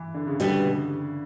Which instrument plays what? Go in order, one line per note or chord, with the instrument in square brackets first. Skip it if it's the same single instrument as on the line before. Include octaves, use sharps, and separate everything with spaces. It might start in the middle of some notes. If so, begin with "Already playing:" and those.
Already playing: [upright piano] E3
D3
C#3
[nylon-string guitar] B2 G3 B3 [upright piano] D3